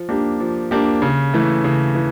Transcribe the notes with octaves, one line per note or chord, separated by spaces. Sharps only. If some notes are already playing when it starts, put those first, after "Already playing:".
Already playing: F3
A#3 D4 G4
F3
A#3 D4 G4
C#3
E3 A3
C#3
E3